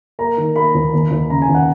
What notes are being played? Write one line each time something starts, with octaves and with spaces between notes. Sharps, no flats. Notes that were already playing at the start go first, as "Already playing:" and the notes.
A#3 A#5
D#3
A#3 B5
D#2
D#2
D#2
C#3 A#5
G#5
D#2
F#5